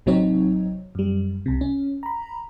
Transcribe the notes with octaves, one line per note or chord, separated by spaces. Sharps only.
A1 C3 F#3 C4 D#4 C#5
F#2 G3
C2 C3
C#4
A#5 B5